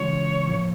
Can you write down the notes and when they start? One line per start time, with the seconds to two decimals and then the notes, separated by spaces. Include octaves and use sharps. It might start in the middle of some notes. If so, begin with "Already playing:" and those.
Already playing: C#3 E3 G#3 C#4 F4 C#5
0.47 A2 F3 A#3